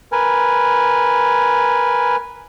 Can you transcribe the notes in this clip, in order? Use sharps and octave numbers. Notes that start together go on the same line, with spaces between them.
A#4 B4 G#5